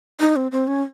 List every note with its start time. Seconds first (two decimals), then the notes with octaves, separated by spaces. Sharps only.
0.20 D#4
0.36 C4
0.51 C4
0.67 C#4